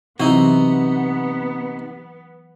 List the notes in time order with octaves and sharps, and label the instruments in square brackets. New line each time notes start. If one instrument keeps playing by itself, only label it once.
[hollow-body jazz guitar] C3 [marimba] E3 F#3 E4 [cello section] B3 [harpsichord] D#4 F#4